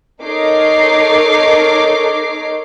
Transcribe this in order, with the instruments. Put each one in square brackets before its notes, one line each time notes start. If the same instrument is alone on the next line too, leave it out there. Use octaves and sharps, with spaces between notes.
[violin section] D#4 A4 A#4 C#5 D6 C7